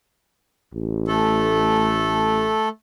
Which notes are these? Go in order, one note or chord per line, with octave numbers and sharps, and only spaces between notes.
A1
A3 A4